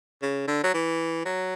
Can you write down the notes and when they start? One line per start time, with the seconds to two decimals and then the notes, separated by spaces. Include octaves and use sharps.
0.22 C#3
0.48 D3
0.63 F#3
0.74 E3
1.25 F#3